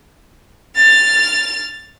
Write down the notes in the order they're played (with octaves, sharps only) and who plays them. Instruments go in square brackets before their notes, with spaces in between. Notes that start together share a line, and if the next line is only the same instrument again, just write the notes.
[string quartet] F6 A6